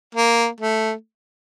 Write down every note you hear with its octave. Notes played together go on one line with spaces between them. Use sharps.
A#3
A3